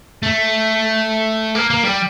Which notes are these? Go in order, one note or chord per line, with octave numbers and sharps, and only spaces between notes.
A3
A#3
A#3
G3